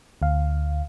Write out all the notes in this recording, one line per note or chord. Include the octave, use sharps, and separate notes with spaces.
D2 F5